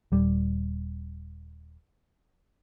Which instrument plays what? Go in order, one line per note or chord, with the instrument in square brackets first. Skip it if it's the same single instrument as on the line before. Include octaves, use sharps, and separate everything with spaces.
[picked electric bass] D#1 G3